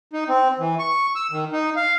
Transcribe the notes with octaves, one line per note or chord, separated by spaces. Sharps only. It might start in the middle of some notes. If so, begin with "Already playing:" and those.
D#4
C4
E3
C#6
E6
D#3
D#4
F5